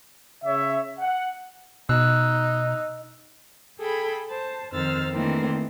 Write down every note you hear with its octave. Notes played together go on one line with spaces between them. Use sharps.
C#3 C#5 E5
F#5
B2 D#4 E6 F#6
G#4 A4 G5 B5
C5 A5
F2 D#3 C5 E6 F6 A6
D#3 E3 A3 A#3 C4 D4